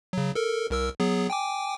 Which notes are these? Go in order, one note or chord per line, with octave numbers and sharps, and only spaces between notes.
C#3 F#3
A4 A#4
C2 A#4 E6
F#3 B3 G#4
G5 G#5 D6